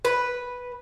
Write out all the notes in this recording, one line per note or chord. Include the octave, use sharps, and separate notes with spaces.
B4